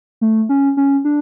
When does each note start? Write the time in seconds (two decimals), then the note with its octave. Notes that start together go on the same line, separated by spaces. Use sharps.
0.21 A3
0.49 C#4
0.77 C#4
1.05 D4